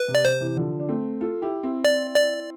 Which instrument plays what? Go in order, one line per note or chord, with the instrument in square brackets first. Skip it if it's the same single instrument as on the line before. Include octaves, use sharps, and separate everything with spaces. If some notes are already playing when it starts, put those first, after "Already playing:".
Already playing: [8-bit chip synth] B4
[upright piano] C3
[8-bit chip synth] D5
[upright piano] C3 [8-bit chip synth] C5
[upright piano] C3 E3
D3 F3
D4
A3 C4
F4 A4
E4 G4
C4 E4
[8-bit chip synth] D5
D5